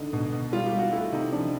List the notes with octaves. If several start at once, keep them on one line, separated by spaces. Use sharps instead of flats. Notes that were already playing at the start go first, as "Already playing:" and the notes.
Already playing: D3 D#4
B2
B2
G3 F4
G4
G3
F#4
A3 E4
C3 D#4
F3 D4